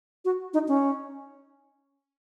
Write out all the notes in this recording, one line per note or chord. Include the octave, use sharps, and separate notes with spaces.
F#4
D#4
C#4